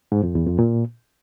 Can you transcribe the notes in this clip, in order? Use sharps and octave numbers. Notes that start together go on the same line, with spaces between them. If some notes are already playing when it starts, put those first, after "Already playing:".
G#2
F2
E2
F2
A#2